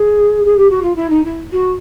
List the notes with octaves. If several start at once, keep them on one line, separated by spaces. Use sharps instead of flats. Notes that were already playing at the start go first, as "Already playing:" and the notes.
Already playing: G#4
G#4
G4
F#4
F4
E4
D#4
E4
F#4